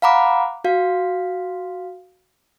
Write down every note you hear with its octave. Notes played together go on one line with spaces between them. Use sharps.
F5 F#5 A#5 B5 D6
F#4 F5